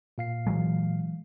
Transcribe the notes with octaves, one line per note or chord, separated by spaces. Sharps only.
A#2 F5 C7
E3 F#3 G#3